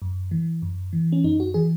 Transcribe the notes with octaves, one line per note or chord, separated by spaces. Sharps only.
F#2
E3
F#2
E3
C#4
F#2 D#4
F#4
E3 G#4